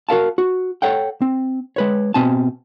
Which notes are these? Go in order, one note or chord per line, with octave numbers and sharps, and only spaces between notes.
F#4 A#4 F5 A5
F#4
A4 C#5 F#5 G5
C4
G#3 B4 C#5
B2 C4 G#5 A5